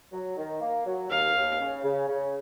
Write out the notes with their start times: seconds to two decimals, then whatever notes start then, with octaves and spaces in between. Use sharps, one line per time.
0.13 F#3
0.37 D#3
0.61 A#3
0.86 F#3
1.10 D#2 F5
1.35 D#2
1.59 C#3
1.83 C#3
2.08 C#3